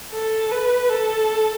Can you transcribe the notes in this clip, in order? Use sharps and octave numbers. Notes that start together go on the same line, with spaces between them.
A4
B4
A4